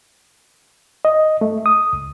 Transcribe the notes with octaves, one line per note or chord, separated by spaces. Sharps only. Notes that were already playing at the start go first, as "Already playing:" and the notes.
D#5
A3
D#6
C#2